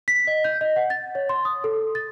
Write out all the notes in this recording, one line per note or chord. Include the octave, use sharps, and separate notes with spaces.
B6
D#5
G6
D#5
F#5
A6
C#5
C6
D#6
A4
A6